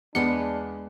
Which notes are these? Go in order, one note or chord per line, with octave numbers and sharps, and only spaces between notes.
E2 G#3 B3 D4 C6 C#7